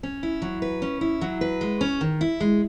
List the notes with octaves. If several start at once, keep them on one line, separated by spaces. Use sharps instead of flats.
C#4
E4
F#3
B4
C#4
E4
F#3
B4
G#3
C#4
D#3
E4
G#3